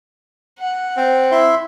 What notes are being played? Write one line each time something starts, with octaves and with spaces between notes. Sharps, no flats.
F#5
C4
E4 E5 C6